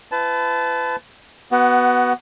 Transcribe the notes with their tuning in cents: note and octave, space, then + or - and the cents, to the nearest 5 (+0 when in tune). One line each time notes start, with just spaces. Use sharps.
E4 +35 B4 +35 A5 -15
B3 +0 F#4 +20